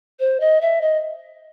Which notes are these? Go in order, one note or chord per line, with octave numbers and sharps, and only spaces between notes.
C5
D#5
E5
D#5